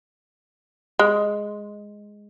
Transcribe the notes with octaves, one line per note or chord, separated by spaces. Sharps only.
G#3